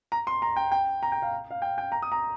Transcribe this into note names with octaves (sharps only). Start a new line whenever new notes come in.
A#5
C6
A#5
G5
G5
A#5
G5
F5
F5
G5
G5
A#5
D#6
A#5